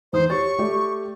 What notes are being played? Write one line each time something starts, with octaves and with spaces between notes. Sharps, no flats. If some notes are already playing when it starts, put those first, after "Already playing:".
E2 D#4 C5 D#6
G4 C#5 C#6 A6
A3 G4 D5